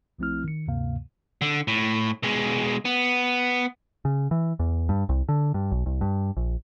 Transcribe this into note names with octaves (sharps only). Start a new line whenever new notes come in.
B1 F3 A3 C4 E4 F6
D#3 C#7
D2 G2 C3 A#3 F5
D3
A2
B2 G#3
B3
C#3
E3
E2
G2
C2
D3
G2
B1
C2
G2
A#1